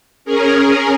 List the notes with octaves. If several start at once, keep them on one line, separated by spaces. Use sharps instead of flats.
C#4 G#4 A#4